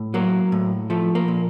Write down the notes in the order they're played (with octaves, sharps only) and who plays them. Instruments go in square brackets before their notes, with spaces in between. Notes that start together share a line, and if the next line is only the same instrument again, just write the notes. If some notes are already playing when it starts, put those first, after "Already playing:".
Already playing: [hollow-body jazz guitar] A2
F#3 A#3
A2
F3 A3
A#3
A#2